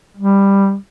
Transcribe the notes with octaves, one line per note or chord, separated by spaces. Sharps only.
G3